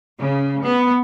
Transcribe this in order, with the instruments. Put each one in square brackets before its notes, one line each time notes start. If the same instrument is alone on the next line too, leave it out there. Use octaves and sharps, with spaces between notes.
[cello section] C#3
B3